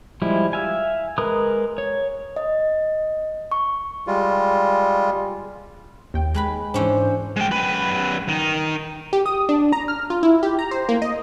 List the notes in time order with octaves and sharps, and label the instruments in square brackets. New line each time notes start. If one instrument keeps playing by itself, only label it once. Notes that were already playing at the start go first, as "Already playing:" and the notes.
[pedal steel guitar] F3 G3 G#3 E4
E5 F5 G#5
G#3 A#4 B4 D#6 F#6
C#5
[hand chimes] D#5
C#6
[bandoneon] G3 G#3 F4
[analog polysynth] D#2 G5
[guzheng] G#3 B4 B5
[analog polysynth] G#2 [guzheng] E3 C#4 D4 [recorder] C5
[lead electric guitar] G#3 G5
F#2 B4
D#3 D#4
[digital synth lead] G4
D#6
D4
A#5
F6
F4
E4
G4
A#5
C5
A#3
D#5